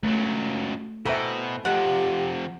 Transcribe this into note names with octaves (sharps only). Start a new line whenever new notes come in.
C#2 F#3 A3
B2 E3 C4 A4 E5 A#5
F2 C3 G4 F#5